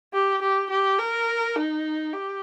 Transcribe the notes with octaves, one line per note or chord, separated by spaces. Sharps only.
G4
G4
G4
A#4
D#4
G4